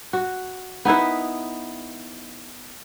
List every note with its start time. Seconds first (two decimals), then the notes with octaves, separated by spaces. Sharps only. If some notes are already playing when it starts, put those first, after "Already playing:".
0.13 F#4
0.85 B3 D#4 E4 B4